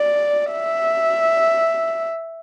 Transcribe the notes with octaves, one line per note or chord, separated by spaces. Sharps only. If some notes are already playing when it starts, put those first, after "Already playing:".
Already playing: D5
E5